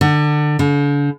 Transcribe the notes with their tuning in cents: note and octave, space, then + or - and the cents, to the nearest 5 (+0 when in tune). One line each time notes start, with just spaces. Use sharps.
D3 +25
D3 -40